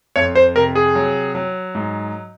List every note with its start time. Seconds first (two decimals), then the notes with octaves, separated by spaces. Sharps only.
0.16 F2 C#5
0.35 C5
0.56 C3 A#4
0.75 G#4
0.95 F#3
1.35 F#3
1.75 G#2